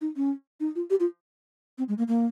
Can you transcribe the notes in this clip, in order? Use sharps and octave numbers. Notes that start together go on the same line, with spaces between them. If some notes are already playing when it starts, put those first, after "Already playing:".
D#4
C#4
D#4
F4
G4
F4
C4
G#3
A#3
A#3